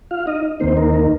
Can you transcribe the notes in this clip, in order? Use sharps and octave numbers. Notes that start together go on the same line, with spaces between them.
F4 F5
D#4 D#5
D#2 D#3 A#3 C4 D#4 C5
A#3 A#4
A#3 A#4